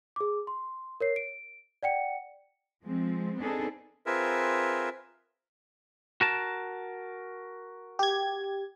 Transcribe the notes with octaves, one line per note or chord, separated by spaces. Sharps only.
G#4 D6
C6
A#4 C#5 C7
D7
D5 F#5 G5 C#7
F3 G#3 C4
B3 C4 D4 D#4 G#4 A4
C4 F4 G#4 A#4 B4 E5
F#4 A#4 A5
G4 G#6